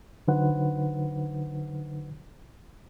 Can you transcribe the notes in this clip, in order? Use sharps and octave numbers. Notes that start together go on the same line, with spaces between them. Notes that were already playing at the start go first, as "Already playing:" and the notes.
D3 F#3 D#4 B4 C5 F#5